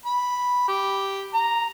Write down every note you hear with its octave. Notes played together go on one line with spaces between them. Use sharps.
B5
G4
A#5